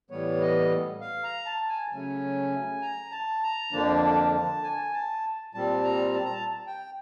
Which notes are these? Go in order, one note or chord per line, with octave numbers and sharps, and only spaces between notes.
A2 E3 G3 B3 C#5
D#5
F5
A#5
A5
G#5
C#3 F#3 A3 C#4 G#5
A#5
A5
A#5
F2 D3 F3 A#3 D4 A5
G#5
A5
A#2 G3 C4 A5
A#5
A5
A#5
A5
G5